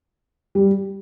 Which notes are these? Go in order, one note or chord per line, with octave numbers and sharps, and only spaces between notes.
G3